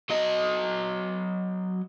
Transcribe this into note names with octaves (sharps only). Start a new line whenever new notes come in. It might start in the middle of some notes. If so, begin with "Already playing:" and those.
F#3 D#5